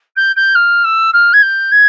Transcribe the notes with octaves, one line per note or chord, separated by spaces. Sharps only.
G6
G6
F6
E6
F6
G#6
G6
G#6